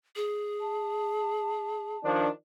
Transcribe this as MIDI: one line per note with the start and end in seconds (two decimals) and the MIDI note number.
0.16 1.97 68
0.61 2.11 81
2.04 2.28 51
2.04 2.28 53
2.04 2.28 62